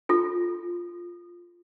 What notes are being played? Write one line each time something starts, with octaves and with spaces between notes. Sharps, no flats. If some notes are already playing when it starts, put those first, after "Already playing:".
F4 A4